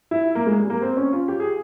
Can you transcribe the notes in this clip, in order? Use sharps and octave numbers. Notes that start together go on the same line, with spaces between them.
E4
A#3
G#3
G3
A#3
C4
C#4
F4
G4
G#4